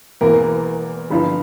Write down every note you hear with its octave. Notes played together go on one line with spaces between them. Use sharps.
E1 E2 E3 A#3 A#4
G1 G2 F3